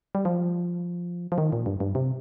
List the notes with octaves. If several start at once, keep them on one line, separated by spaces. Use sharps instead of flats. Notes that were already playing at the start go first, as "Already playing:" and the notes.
G3
F3
F3
D#3
A#2
G2
G2
C3